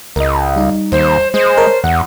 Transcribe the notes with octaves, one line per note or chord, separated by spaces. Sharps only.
C#2 A#4 D#5
G3 D#4
D#2 C5
G#3 C5
A#4 C#5 A5
E2 F#5